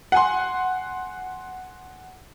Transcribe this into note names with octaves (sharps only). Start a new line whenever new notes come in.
F#5 G#5 C6